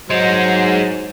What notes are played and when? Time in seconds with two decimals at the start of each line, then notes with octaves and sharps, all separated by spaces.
0.10 F#3 G#3 D#4 C5